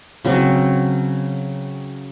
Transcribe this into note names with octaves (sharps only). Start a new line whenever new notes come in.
C#3 F#3 C4 D6